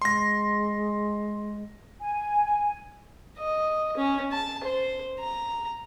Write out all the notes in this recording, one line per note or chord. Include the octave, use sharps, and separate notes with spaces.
G#3 C6 A#6
G#5
D#5
C#4
A5
C5
A#5